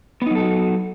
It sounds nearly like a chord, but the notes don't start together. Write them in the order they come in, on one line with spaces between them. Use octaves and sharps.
B3 D#4 F#3 A4 F#4